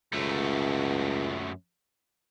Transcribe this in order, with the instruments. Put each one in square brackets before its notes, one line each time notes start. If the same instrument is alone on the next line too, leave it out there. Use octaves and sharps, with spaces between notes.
[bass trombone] C#2 [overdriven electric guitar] F#2 A3